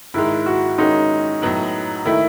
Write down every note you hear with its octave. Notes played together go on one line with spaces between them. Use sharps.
G#2 D#3 G#3 E4
F#4
D#3 G#3 C#4 D#4
A2 F#3 B3
D#3 A3 E4